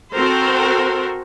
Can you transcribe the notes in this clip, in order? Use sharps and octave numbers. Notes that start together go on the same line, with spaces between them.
C4 F#4 A4 A#4 C5